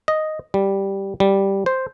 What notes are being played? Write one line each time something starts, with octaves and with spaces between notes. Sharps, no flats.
D#5
G3
G3
C5